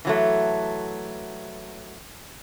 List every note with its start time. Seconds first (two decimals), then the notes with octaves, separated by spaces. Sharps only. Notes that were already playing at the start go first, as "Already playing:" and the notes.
0.05 E3 F#3 A3